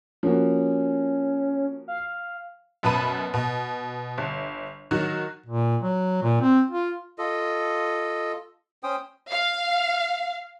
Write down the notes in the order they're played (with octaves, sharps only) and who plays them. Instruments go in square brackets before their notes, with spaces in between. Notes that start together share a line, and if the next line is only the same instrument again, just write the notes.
[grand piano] F3 A#3 F#4 [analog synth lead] C#4
[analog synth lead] F5
[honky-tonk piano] F#2 B2 B4 A5 B5 D#7
B2
G1
D#3 F#3 F#4
[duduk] A#2
F#3
A#2
C4
F4
[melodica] F4 A4 D#5
C#4 C5 G5 D#6
[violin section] F5